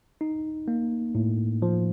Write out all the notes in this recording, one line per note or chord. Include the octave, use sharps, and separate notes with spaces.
D#4
A#3
A2
F3